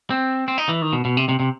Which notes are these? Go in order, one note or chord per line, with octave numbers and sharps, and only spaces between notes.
C4
C4
D#4
E3
D#3
B2
B2
C3
C3
C3